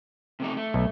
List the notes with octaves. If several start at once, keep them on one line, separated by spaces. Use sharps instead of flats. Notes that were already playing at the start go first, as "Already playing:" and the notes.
C3 A3 D#4
A3
B1